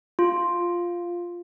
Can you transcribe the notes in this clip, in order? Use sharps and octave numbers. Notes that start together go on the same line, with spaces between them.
F4